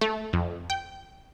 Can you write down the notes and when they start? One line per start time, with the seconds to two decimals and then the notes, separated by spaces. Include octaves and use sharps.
0.01 A3
0.33 F2
0.70 G5